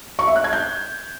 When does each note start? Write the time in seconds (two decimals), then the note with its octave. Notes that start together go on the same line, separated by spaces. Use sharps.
0.19 C#6
0.27 E5
0.36 F#6
0.44 G#6
0.53 G6